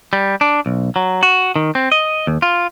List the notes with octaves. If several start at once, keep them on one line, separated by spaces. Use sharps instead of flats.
G3
D4
B1
F#3
F#4
D#3
C4
D#5
D#2
F4